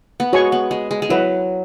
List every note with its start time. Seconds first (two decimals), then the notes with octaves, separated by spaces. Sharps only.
0.20 B3
0.33 G#3 F#4 C#5 G#5 C#6
0.52 B3
0.71 G#3
0.91 G#3
1.02 G#3
1.10 F#3 E4 B4 F#5